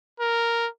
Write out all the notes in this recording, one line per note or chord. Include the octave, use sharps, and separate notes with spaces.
A#4